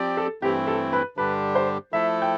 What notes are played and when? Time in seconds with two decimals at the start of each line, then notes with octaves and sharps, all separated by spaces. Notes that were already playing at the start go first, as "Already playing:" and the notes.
Already playing: F3 C4 G4 D5
0.17 A4
0.42 G2 E3 A3 C4 E4 G4
0.67 A4
0.93 B4
1.17 G2 D3 G3 D4 G4 B4
1.55 C5
1.92 F3 A3 E4 A4 E5
2.22 G5